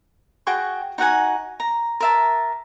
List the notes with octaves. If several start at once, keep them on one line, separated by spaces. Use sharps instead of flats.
F#4 G#4 G5 C#6
D#4 F#4 F#5 G#5
A#5
A#4 E5 A5